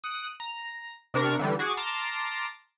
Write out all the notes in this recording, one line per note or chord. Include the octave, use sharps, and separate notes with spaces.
D#6 F#6 C#7 D7
A#5
C3 D4 A#4 C#6
D3 E3 G3
F#4 G#4 C#6 D6
A5 A#5 C6 D6 F6 A#6